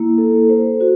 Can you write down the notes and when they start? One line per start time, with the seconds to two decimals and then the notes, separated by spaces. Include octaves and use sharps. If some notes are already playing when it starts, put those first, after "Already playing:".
Already playing: A#3 E4
0.18 A4
0.49 C5
0.81 F#4